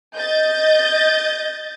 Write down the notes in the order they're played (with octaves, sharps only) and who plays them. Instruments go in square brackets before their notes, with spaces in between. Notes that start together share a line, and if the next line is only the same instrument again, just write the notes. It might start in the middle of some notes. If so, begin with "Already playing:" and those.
[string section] D#5 G6 A6